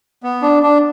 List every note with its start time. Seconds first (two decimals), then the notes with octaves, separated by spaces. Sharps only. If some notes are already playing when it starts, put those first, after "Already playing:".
0.23 B3
0.42 D4
0.63 D4